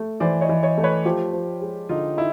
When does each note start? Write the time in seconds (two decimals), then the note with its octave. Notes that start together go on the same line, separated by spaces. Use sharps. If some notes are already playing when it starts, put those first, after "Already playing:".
Already playing: A3
0.20 E3 C5 D5
0.41 C#5 D#5
0.49 E3
0.63 C#5 D#5
0.78 A3
0.84 B4 C#5
1.05 F3 F4 G4
1.33 F3
1.61 G#3
1.89 D3 D#4 F4
2.17 D#4 E4